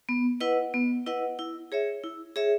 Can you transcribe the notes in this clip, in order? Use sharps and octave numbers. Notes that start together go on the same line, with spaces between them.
B3
E4 B4 D#5 F#5
B3
E4 B4 D#5 F#5
E4
G#4 C#5 E5
E4
G#4 C#5 E5